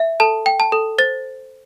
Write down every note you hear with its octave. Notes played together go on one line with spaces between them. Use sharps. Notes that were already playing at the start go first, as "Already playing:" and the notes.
Already playing: E5
A4 A5
G5
A5
A4
C5 A6